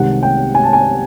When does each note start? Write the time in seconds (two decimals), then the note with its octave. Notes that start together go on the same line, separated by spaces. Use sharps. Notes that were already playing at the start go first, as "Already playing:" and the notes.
Already playing: C2 C3 D#3 G#3 F#5
0.23 G5
0.55 G#5
0.63 A5
0.73 G#5